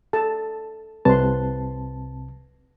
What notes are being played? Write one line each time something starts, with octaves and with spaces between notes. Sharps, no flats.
A4 A5
C2 C3 B4 A5 C6